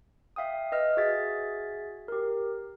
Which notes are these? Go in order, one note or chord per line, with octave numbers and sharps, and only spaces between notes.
E5 F5 G5 D#6
B4 D#5 E6 F6
F#4 G#4 E5 G#6 A6 B6
G4 A#4